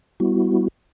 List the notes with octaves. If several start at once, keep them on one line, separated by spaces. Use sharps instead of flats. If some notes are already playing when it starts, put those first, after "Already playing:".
G3 B3 E4 F#4